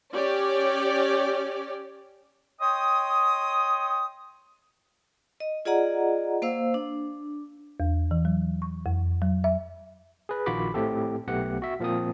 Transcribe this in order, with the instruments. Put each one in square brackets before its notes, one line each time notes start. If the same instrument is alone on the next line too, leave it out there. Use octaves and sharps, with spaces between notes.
[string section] C#4 G4 C#5 D5
[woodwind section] C#5 D#5 G5 C6 D#6
[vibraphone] D#5
F4 G#4 D5 D#5 F#5 A#5
A#3 C5 F5 E6
D4
[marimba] E2
E3
F#3
C#6
F2
F#3
E5
[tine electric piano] G#4 B4
A#1 D#3 F4 F#4 B5 D6
A2 A3 C4 G4 A4
B1 A3 B3 G4 F#5
F#4 E5
A#2 F3 A#3 C4 D#6